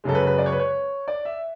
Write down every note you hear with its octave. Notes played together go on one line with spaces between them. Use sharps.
F#2 C#3 G#3 A4
B4
B4
D5
C#5
B4
C#5
D5
E5